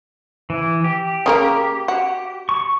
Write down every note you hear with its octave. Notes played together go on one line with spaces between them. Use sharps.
E3
G4
C#3 A#3 A#4
F#4
C#6